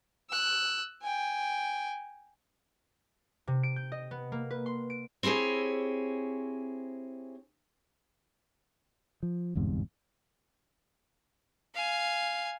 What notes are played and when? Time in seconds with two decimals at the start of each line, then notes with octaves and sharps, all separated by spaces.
0.30 E6 F#6
1.02 G5 G#5
3.47 C3
3.63 D7
3.76 G6
3.92 D#5
4.11 B3
4.32 A#3
4.51 B4
4.66 C6
4.90 D7
5.23 C4 E4 G4 G#4 C#5
9.23 F3
9.55 G1 E2 G#2 C3
11.75 F5 G#5